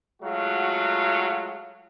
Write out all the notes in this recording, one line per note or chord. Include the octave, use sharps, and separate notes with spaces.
F#3 G#3 A3 F4 F#4